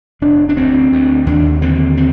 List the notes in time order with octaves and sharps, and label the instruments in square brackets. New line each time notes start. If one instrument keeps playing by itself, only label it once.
[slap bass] F1 D4
D4
D2 C4
D2
D#2 D4
D3 C4
C4